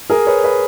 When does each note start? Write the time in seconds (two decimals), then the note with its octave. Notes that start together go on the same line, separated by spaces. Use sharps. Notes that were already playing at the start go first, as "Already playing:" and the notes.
0.10 G#4 A#4
0.27 B4 C#5
0.44 B4 C#5